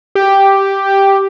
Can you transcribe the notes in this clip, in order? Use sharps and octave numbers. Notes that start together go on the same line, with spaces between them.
G4